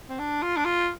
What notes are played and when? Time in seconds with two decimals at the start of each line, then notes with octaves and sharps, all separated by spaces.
0.09 C4
0.19 D4
0.43 F4
0.57 D4
0.65 F4